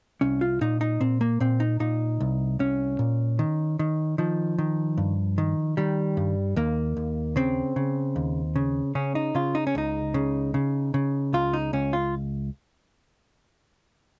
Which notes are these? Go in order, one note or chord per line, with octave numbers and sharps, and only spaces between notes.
C2 C#4
F4
A#2 D#4
D#4
A#2 C4
A#3
A#2 C4
D#4
A#2 D#4
C2
C2 C#4
A#2
D#3
D#3
D#3 F3
D#3
G2
D#3
D#3 G3
G2
D#2 A#3
D#2
C#3 C4
C#3
D#2
C#3
C#3 C#4
D#4
C#3 F4
D#4
C#4
C#2 D#4
C#3
C#3
C#3
C#2 F4
D#4
C#2 C#4
F4